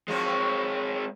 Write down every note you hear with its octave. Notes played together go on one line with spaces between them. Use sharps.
F3 F#3 G#3 C4 C#5